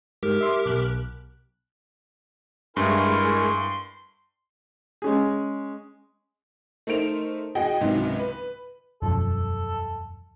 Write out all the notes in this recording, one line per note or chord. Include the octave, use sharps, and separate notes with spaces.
G#2 G4 A#4
E5 C6 D6
B1 F#6
G2 G#3 E4 A#4 G#5 C6 C#6
G#3 C#4 G#4
A3 D#4 A#4 C5 D7 F7
F#4 G#4 D#5 G5
C#2 G#2 C3 D#3 E3 F#3
B4
E1 F#2 F3 A4